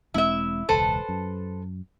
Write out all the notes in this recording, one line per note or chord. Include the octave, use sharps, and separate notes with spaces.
E1 G#3 C4 E4 E5
E1 C#2 A4 B4 C5
F#2